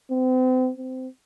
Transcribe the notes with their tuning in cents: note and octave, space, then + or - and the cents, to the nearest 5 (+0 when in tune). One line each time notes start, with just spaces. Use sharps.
C4 -40
C4 -20